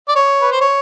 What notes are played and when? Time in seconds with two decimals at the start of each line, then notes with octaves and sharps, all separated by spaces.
0.09 D5
0.16 C#5
0.41 B4
0.52 C5
0.61 C#5